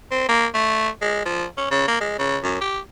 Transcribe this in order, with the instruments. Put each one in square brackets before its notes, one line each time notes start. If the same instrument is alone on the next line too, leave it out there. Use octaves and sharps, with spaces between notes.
[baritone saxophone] C4
A#3
A3
G#3
F3
C#4
C#3
A#3
G#3
C#3
F#2
G4